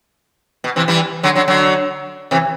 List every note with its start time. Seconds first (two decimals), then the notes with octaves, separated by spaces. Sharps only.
0.64 B2
0.76 C3 E3
0.88 E3 G3
1.23 D3 F#3
1.35 D3 F#3
1.48 D3 F#3
2.31 C3 E3